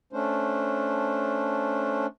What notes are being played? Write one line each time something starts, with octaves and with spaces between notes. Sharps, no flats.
A3 C#4 D4 C5